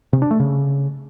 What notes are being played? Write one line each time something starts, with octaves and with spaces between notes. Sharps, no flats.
C3
D4
A3
C#3